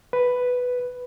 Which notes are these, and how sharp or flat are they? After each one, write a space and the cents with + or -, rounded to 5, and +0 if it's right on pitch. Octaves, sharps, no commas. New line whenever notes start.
B4 +5